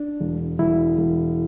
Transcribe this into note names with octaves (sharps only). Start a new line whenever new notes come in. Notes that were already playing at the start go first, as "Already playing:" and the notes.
Already playing: D4
E1
E1 E4
E1